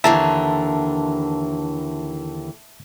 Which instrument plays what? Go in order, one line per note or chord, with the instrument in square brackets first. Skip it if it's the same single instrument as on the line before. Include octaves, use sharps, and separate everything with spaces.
[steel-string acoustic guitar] D#2 D3 E3 [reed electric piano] E5 A5 A#5